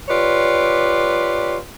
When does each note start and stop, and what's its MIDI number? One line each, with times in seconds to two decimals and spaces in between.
0.09 1.58 65
0.09 1.58 67
0.09 1.58 71
0.09 1.58 73
0.09 1.58 74